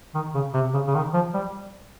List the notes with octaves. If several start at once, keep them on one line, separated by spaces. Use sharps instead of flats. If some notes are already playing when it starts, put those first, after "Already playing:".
D#3
C#3
C3
C#3
C#3
D#3
F3
G3